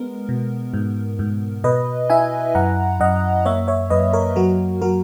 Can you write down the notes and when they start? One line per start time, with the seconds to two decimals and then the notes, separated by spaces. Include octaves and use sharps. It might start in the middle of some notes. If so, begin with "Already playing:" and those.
Already playing: G#3 B3 A#4
0.29 B2
0.74 G#2
1.19 G#2
1.64 B2 B4 D#5
2.10 E4 E5 G#5
2.55 F#2 F#5 A#5
3.00 F#2 D#5 F#5
3.45 A#3 C#5 E5
3.68 C#5 E5
3.90 F#2 B4 D#5
4.13 A#4 C#5
4.36 F#3 F#4 A#4
4.81 F#3 F#4 A#4